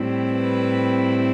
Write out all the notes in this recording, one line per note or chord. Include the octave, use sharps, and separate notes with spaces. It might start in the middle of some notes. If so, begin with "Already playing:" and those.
Already playing: A2 G3 C4 E4
B4